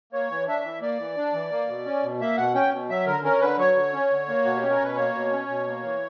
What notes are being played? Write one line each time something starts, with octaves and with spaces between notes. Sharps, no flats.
A#3 C#5
E3
D4 E5
E3
A#3 D5
E3
D4
E3
A#3
B2
C#4
B2
A#3 E5
B2 F#5
C#4 G5
B2
F#3 E5
D3 A#4
C#4 A#4
D3 B4
F#3 C#5
D3
C#4
D3
A#3
B2 F#4
G4
C#4
A#4
B2 B4
A#3 C#5
B2
C#4
B2
A#3
E3